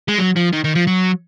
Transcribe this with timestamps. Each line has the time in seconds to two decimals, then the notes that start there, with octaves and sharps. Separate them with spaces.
0.09 G#3
0.18 F#3
0.36 F3
0.53 D#3
0.64 D#3
0.75 F3
0.87 F#3